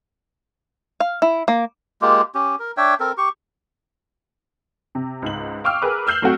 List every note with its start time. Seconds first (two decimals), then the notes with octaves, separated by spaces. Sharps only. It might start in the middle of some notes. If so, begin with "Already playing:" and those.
1.00 F5
1.22 E4
1.48 A#3
2.02 G#3 A#3 F4 G4
2.35 C#4 G4
2.59 A#4
2.77 D4 C#5 E5 G5
3.00 C4 A4 A#4
3.18 G4 C#6
4.95 C3
5.22 C#2 G#2 F#7
5.64 F5 G5 C#6 D6 E6 F6
5.82 G#4 A#4 B4 D6
6.07 E6 F6 G6 C7 E7 F#7
6.22 F#3 A3 C4 F#4